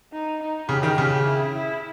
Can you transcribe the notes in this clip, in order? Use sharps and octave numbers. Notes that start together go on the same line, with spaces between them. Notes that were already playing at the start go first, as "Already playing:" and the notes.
D#4
D#4
C#3 G4
D#3
C#3 G4
E4
E4